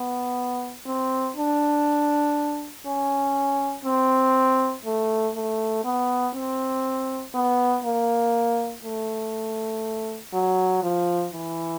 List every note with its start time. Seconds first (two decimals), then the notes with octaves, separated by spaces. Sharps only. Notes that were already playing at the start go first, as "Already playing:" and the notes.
Already playing: B3
0.86 C4
1.36 D4
2.86 C#4
3.85 C4
4.85 A3
5.35 A3
5.85 B3
6.34 C4
7.34 B3
7.85 A#3
8.84 A3
10.34 F#3
10.83 F3
11.33 E3